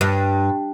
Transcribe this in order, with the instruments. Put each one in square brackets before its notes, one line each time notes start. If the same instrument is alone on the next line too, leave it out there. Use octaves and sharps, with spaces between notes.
[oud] G2